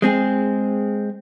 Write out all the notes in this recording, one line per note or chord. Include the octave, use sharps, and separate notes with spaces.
G#3 C4 G#4